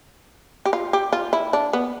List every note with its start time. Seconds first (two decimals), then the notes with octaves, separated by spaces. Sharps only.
0.66 G4
0.73 F4
0.93 G4
1.13 F4
1.33 E4
1.53 D4
1.73 B3